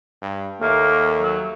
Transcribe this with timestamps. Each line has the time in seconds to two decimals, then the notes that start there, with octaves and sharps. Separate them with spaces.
0.22 G2
0.61 D#2 A3 A#3
1.21 F#3